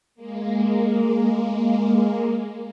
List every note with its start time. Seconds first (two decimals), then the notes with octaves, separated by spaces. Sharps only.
0.15 G#3 A#3